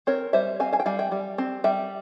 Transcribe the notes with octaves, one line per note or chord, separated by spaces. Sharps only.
C4 A#4 C#5
G3 C5 E5
C4 F5 G#5
F5 G#5
G5
G3 F5 G#5
E5 G5
G3
C4
G3 E5 G5